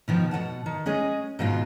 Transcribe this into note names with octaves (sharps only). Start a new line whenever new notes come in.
B2 D#3 F3
B2 F3 F#5 A5
D#3
G#3 C#4 G#4 D#5
G#2 B2 D#3 F4